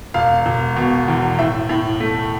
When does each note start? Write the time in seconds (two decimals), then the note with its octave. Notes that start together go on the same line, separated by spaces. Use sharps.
0.14 E1 F5
0.46 E1
0.76 B2
1.08 E2
1.39 A2 E5
1.69 A2
2.00 A3